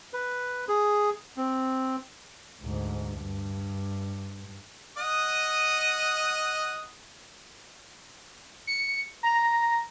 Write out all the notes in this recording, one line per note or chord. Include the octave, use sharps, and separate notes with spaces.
B4
G#4
C4
D2 G#2
G2
D#5 F#5 D#6
C#7
A#5